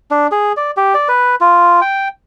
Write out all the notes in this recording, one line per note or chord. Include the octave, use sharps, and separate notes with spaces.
D4
G#4
D5
G4
D5
B4
F4
G5